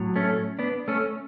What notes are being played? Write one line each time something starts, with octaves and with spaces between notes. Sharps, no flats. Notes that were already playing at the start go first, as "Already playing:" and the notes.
Already playing: A2 F#3
A3 C#4
B3 D4
A3 C#4